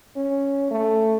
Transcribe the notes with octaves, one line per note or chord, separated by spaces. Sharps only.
C#4
A3